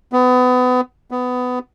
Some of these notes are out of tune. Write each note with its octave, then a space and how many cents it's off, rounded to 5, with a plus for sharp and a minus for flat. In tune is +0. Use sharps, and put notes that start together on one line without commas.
B3 +30
B3 +20